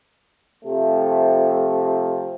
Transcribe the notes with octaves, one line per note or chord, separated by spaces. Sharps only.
C3 F3 A3